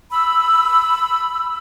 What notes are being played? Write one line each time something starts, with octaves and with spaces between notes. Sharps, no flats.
B5 E6